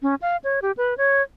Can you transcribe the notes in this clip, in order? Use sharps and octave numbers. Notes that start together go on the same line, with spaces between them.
C#4
F5
C#5
G4
B4
C#5